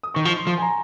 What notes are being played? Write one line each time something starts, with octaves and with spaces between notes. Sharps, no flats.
D#6
D#3 C#6
F3 C#6
C6
F3 C6
G#5
A#5